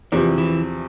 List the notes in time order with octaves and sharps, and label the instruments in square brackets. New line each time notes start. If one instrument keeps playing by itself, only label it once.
[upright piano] E2 C3 F3 [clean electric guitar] E3
[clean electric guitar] E3